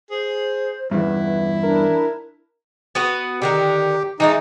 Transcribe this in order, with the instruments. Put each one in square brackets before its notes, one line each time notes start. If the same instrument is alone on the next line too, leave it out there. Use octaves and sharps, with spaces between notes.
[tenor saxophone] G#4 [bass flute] C5
[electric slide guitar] E2 G2 [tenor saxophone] E4 [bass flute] B4
[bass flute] D4 [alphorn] A#4
[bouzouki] B3 F#4 B4
[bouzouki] D3 D#3 A#4 [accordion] G4
[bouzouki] E3 G#3 A3 [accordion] D#4